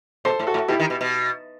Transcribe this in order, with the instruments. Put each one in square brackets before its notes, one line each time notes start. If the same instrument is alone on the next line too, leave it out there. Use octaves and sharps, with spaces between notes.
[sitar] B2 [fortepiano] A4 C5
[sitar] A2
[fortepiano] F#4 A4
[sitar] A2
[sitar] B2 [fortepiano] E4 G4
[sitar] D#3
B2
B2